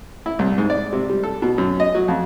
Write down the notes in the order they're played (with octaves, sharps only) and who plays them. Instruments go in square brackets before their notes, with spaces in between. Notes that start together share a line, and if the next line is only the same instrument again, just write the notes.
[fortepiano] E4
C2
G#2
D5
C3
G3
A4
B2
F#2
D#5
F#3
F2